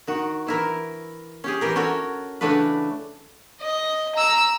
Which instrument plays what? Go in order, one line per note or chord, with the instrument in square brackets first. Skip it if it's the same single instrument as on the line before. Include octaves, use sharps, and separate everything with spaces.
[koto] D#3 F#4
E3 E4 A#4
C#4 G4 G#4
E3 G4 A#4
C#4 F#4 A4 A#4 C#5
C#3 E3 A3 D4 F#4 B4
[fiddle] D#5
A#5 E6